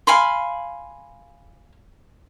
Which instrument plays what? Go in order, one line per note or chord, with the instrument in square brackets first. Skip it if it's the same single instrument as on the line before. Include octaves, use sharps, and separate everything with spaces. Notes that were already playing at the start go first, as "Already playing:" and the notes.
[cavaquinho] F5 G#5 B5 C6